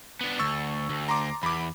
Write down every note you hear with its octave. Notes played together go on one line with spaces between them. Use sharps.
B3 D4
D2 C#6 E6 A6
D2
A#5 C6 D6
E2 B5 D6